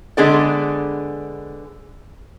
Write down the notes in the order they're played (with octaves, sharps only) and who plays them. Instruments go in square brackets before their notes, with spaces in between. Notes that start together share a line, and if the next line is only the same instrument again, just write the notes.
[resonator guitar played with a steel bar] D3 G#3 B3 G#4 C5 D5